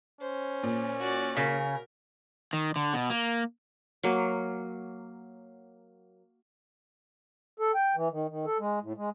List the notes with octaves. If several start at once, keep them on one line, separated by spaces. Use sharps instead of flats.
C#4 C5
A#2
F#4 D5
C#3 A#4
D#3
D3
B2
A#3
F#3 A#3
A4
G5
E3
D#3
D#3
A4
G#3
A2
G#3